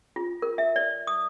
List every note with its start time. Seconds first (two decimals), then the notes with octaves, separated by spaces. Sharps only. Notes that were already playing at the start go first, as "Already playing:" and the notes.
0.16 F4
0.42 A#4
0.58 E5
0.76 D5
1.07 D#6